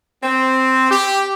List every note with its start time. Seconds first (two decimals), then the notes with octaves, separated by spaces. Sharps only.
0.23 C4
0.91 G4